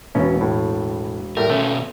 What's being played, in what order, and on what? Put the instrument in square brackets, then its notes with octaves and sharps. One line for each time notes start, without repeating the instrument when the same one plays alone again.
[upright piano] E1 [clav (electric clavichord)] B2 C#4
[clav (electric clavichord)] A2
[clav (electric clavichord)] A2 G3 A3 [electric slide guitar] A#4
[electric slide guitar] B2 C#4 [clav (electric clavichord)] A3